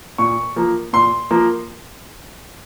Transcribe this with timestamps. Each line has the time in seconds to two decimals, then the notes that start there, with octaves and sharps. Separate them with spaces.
0.18 A#2 C#6
0.56 F3 A#3
0.93 A#2 C6
1.31 F3 A#3